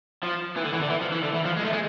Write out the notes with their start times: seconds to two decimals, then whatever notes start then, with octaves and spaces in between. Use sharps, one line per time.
0.23 F3
0.56 E3
0.65 D3
0.73 E3
0.81 D3
0.90 E3
1.01 F3
1.12 E3
1.23 D3
1.34 E3
1.45 F3
1.57 G#3
1.64 A3
1.73 G#3